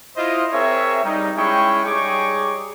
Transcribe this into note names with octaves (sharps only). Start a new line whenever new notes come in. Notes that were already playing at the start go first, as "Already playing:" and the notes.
E4 F4 C5 D#5
C4 G#4 A#4 C#5 E5
G3 D#4
G#3 C#4 E4 G#4 G5 C#6
G3 D#4 G#4 C#5 C#6 D6